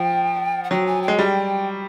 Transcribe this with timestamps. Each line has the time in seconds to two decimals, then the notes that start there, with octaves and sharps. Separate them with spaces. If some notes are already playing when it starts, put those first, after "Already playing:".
Already playing: F3 G5
0.64 F#5
0.71 F#3 G5
0.86 G#5
1.02 G5
1.08 G#3
1.19 G3 G5